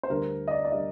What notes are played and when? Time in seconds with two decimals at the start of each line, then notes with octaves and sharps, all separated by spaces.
0.03 C5
0.10 D2 D3 G3 A#4
0.48 D#5
0.51 D5
0.65 D5
0.72 D3 G3 D#5